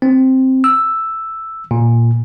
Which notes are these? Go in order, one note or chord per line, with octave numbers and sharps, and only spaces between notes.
C4
E6
A#2